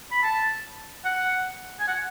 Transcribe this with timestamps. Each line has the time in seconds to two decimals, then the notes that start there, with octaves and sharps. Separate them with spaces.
0.11 B5
0.23 A5
1.05 F#5
1.80 G#5
1.88 F#5